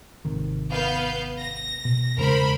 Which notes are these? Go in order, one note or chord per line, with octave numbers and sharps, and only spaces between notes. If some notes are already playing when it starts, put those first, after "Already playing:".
G#1 C3 D#3
B3 F5 G6
A#6
B2
E2 C#3 G#3 A#4 C5 B5